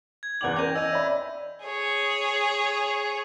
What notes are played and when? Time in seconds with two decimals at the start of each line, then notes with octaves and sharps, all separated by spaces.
0.23 G#6
0.41 E2 B4 D5 F#5 D6 F#7
0.56 C#4 A#4 G5 G6 A#6 D#7 F7
0.75 D#5 G#5 E6 A#6 D#7
0.92 C#5 D5 E5 B5
1.64 G#4 C#5